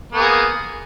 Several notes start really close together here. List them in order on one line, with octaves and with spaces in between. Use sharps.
B3 A#3 G#4